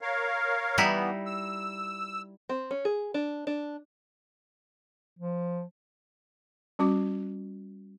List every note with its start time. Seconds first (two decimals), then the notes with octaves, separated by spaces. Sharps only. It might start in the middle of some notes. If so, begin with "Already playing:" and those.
0.01 A#4 C#5 F5
0.78 E3 G3 B3 D#4 E4
1.26 E6
2.49 C4
2.71 C#4
2.85 G#4
3.14 D4
3.47 D4
5.19 F3
6.79 G3 C#4 F#4 D6